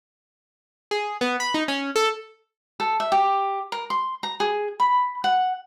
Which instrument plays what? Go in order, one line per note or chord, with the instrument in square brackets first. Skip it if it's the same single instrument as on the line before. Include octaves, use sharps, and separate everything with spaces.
[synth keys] G#4
B3
B5
D#4
C#4
A4
[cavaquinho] A4
E5
G4
A#4
C6
A#5
G#4
B5
F#5